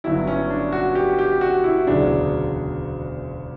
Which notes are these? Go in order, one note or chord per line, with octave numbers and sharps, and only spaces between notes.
G1 G2 F#3 E4
C#4
D4
F#4
G4
G4
F#4
E4
E1 D2 C#3 F#3 D4